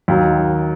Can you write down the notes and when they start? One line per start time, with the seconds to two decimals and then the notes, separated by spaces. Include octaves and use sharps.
0.08 D#2 D#3 F#3